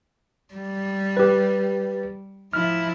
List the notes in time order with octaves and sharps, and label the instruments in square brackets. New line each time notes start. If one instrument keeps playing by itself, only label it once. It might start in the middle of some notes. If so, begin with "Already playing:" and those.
[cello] G3
[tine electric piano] G4 B4
[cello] F3 E4 [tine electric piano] F6